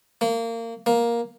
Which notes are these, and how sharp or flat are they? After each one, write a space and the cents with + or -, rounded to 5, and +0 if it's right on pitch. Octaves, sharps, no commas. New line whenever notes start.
A#3 -25
A#3 +10